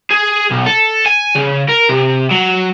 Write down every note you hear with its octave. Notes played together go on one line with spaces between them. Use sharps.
G#4
B1
A4
G#5
C#3
A#4
C3
F#3